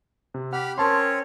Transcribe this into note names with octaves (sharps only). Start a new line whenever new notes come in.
C3
G4 F#5 B5 F6
C4 C#4 A#4 C#5 A5 C6